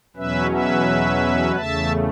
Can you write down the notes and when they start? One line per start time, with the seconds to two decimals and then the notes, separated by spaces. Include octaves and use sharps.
0.17 E2 B2 F#3 C#4 B4 E5
0.51 B4 E5
1.55 E2 C#3 A3 E5 A5